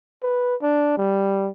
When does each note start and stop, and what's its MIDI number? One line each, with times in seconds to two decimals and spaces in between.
0.23 0.55 71
0.62 0.95 62
0.98 1.50 55